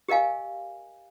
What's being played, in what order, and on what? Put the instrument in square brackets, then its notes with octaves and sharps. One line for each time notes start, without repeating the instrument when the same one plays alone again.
[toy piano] G4 A#4 D#5 F5 G#5